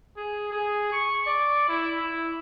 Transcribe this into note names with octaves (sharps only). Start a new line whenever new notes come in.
G#4
G#4
C#6
D5
E4
E4